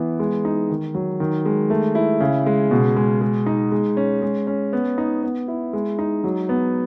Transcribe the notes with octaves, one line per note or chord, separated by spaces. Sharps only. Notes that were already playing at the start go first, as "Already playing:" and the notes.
Already playing: E3 B3
G#3
D#4
D#3
F#3
D#3
G#3
A3
E4
C#3
G#3
B2
G#3
G#3
D#4
G#3
C#4
G#3
C#4
B3
D#4
B3
E4
G#3
D#4
F#3
B3